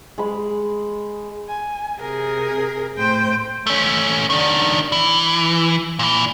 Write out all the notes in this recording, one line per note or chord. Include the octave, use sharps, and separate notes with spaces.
G#3 B5
G#5
C3 G#4 A#4
A2 C5 G5
A3 C#4
D#3 D4
E3
A#2 E3